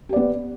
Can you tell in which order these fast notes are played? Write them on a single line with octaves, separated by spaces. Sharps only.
G4 D5 B3